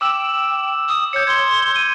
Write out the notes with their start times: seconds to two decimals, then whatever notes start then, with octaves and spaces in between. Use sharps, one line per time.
0.01 G5 D6 E6 E7
0.89 D#6
1.13 C#5 G6 C#7
1.27 C6 G#6
1.76 D#7